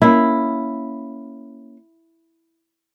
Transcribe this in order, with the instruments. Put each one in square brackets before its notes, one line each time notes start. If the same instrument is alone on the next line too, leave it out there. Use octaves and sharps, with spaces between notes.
[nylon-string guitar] A#3 C#4 [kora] E4